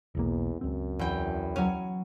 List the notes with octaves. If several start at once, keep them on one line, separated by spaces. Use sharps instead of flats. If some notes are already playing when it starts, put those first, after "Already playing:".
E1 B1 E2 A#3
C#2 F#2 C4
E2 G5
F#3 C#4